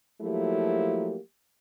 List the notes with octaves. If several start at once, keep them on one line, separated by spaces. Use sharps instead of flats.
F3 F#3 A3 A#3 E4 G4